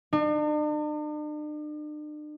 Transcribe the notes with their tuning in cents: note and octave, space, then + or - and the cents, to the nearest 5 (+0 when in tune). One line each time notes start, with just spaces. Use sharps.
D4 +45